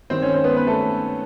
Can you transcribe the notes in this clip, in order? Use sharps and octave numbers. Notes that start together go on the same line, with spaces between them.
G2 D#3 C4 C5
C#4 C#5
C4 C5
B3 B4
B3 B4
A3 A4